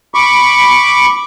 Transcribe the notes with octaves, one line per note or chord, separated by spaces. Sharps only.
B5 C#6 D6